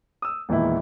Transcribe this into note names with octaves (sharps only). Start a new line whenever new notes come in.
D#6 E6
E1 E2 A#2 D#3 E4